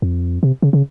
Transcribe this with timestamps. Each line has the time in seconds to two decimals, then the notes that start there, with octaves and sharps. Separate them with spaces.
0.02 F2
0.43 C3
0.62 C#3
0.73 C#3